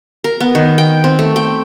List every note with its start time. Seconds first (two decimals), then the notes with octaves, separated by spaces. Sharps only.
0.24 A#4
0.40 B3
0.55 D#3
0.78 G5
1.04 C4
1.19 A3
1.36 G5